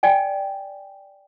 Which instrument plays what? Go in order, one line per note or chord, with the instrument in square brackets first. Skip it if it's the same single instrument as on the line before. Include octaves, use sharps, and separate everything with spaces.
[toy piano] D5 G5 G#5